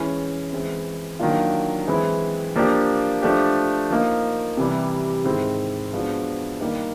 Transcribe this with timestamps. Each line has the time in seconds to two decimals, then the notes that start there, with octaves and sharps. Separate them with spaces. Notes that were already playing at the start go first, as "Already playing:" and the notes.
Already playing: E3 G#3 C#4 E4
0.52 E3 G#3 C4
1.20 D#3 F#3 A#3 D4 F4
1.87 E3 G#3 C4 E4
2.55 F3 A#3 D4 G4
3.22 F3 A3 D4 G4
3.91 F3 A#3 D#4
4.57 C3 E3 G3
5.24 G#2 D#3 G#3 C4 E4
5.93 F3 G#3 B3 D4 F#4
6.60 D#3 G3 A#3 D#4 G4